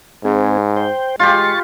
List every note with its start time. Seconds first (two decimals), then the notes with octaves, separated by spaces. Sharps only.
0.25 G#2 C4 G#4
0.77 C5 G5
1.20 G#3 F4 G4 C6 C#6 A6